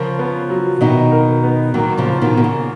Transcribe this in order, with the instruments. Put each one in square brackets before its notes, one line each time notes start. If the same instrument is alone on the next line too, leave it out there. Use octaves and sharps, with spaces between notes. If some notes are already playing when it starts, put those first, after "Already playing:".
Already playing: [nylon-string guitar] C#3 F3 [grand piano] A#4
[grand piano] B3
F#3
[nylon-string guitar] B2 D#3 [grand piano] D#4
[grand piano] A#4
B3
[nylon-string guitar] D#3 F#3 [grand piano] A#3
[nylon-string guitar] C#3 F3
[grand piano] F4
[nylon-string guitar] B2 D#3
[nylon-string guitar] B2 [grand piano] A#3
[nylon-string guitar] C#3